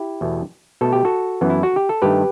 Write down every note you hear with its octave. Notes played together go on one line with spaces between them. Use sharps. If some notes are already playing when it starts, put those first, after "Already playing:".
Already playing: E4 G4
E2 B2 A3
B2 A3 A4
G4
F#4 A4
F#2 E3 B3
E4
F#4
G4
A4
G2 D#3 A3 G4 B4